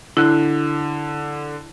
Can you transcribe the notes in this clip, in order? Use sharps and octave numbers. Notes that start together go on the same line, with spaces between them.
D3 E4 F#6